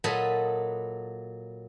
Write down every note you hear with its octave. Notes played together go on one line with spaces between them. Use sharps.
A#2 F#3 A4 B4 D#5